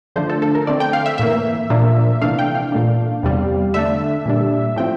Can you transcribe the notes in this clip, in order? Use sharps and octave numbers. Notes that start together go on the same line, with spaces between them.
D3 F3 A3 D4 C5
A4
A4
A#4
D3 A3 C4 D5
G5
F5
E5
A2 E3 A#3 E5
A#2 F3 A#3 D4
C3 E3 A3 D4 F5
G5
F5
A#2 A3 D4
E2 C3 G3
D3 A3 D4 E5
A#2 G3 D4
A2 F3 C4 G5